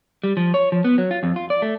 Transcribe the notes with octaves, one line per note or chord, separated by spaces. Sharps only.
G3
F3
C#5
F3
B3
F#3
F4
F2
F4
D5
A3